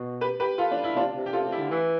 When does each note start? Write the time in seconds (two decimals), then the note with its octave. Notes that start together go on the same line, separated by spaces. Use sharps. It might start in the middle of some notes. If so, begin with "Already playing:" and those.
Already playing: B2
0.21 G4 B4
0.40 G4 B4
0.58 F4 A4
0.71 D4
0.84 E4
0.96 C3 D4 F4
1.15 C3
1.26 G4
1.33 C3 F4 A4
1.45 C3
1.52 E4 G4
1.58 D3
1.70 E3 E4